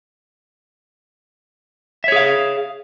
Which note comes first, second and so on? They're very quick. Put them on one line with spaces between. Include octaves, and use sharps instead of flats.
E5 C#5 G#4 F5